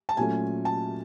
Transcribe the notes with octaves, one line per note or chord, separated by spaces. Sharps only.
A5
A#2 F#3 A3 C#4 G#5
A5